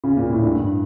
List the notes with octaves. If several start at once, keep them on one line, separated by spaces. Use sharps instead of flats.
C#3
A#2
A2
G2